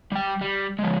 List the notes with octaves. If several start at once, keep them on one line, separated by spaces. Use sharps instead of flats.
G3 G5
G3
F3 G#3